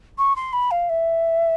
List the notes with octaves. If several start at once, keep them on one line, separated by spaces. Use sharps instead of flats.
C#6
C6
B5
F5
E5